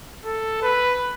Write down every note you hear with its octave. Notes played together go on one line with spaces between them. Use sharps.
A4
B4